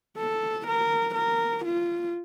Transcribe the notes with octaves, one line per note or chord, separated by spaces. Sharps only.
A4
A#4
A#4
F4